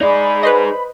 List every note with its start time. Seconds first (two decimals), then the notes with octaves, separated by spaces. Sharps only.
0.01 D#4 G#4 D5 B5
0.43 B4 C5 D#5